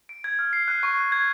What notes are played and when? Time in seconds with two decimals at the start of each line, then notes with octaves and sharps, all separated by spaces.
0.09 D7
0.24 G#6
0.39 F6
0.53 C7
0.68 F#6
0.83 C#6
0.98 F#6
1.12 G#6